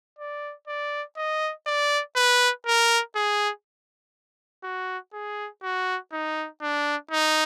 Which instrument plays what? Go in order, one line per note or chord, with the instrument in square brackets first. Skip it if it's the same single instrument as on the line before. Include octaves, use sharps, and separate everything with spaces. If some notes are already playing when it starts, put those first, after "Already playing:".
[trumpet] D5
D5
D#5
D5
B4
A#4
G#4
F#4
G#4
F#4
D#4
D4
D#4